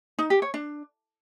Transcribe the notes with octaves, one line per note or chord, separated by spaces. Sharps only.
D#4
G4
C#5
D4